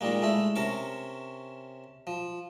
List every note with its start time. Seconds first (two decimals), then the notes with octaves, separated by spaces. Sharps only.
0.01 A#2 D#3 G3 G#3 A#3
0.22 G#3 A3 E4
0.56 C3 C#4 A#4 A5 C#6
2.07 F3